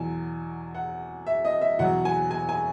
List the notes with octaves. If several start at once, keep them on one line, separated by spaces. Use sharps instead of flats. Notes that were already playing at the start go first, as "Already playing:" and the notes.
Already playing: E2 B2 F#3 G#5
F#5
E5
D#5
E5
E2 B2 F#3 F#5
G#5
G#5
G#5